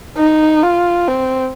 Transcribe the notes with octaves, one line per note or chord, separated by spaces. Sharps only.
D#4
F4
C4